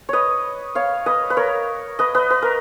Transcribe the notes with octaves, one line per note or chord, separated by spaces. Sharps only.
B4 C#5 D#5
C#5 F5
B4 D#5
B4
A#4 C#5
B4 D#5
B4 D#5
B4
A#4